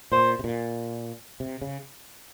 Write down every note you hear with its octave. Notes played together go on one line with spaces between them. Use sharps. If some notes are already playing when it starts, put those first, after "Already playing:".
A#2 C5
C3
A#2
C3
C#3